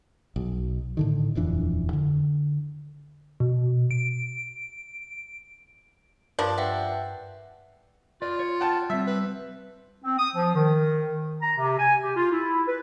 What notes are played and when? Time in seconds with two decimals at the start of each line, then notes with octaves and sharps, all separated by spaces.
0.36 B1
0.97 A2 D3 D#3
1.35 D#1 F2 E3 D4
1.93 D3
3.40 B2
3.91 D7
6.39 G2 F3 D4 A#4 B4
6.58 B4 E5 F#5 G5
8.22 F4 B4 D5
8.39 C#5
8.60 F#5 G5 A5
8.90 G3 C4 E5
9.07 B4
10.04 C4
10.18 D#6
10.35 F3
10.55 D#3
11.42 A#5
11.57 C3
11.79 G#5
12.02 G4
12.16 F4
12.31 E4
12.67 B4